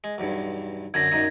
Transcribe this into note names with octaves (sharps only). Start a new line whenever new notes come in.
G#3
B1 E2 G2
F#2 D3 G#6 A#6
F#2 A#2 D#4